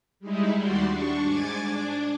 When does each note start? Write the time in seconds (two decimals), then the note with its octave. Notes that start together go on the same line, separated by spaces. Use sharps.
0.20 G3 G#3 D#4 E4
0.55 D#2 G3 F#4 D5 C6
0.85 D4 C#6
1.24 G#2 G#5 D6 G#6 A6
1.62 D4